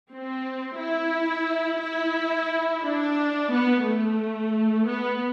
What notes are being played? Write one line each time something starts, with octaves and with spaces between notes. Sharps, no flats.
C4
E4
E4
D4
B3
A3
B3